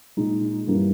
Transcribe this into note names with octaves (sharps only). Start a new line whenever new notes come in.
A#2 G#3 D#4
G2 E3 G3 A#3 C#4